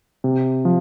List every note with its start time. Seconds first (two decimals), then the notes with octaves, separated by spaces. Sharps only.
0.24 C3
0.65 F3